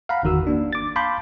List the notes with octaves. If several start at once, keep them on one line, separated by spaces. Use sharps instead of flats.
F5 F#5 A#5 B5
G1 E2 D#3 F#4 E6
A#3 D4
D6 A6
F5 A5 B5 C6 D6 G6